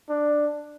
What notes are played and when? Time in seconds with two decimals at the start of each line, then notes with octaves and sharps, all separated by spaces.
0.10 D4